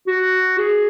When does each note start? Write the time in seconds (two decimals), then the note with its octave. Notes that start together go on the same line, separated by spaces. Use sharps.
0.07 F#4
0.58 G#4